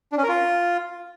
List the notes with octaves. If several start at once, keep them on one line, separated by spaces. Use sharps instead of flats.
D4
C#4
A#4
F4